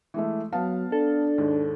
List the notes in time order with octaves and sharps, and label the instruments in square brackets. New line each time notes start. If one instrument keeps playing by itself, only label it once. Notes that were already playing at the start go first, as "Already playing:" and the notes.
[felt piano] E3 G#3 A3
[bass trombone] F#3 [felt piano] B3 F5 A5
[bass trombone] D4 [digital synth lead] A4
[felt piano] D#2 G#2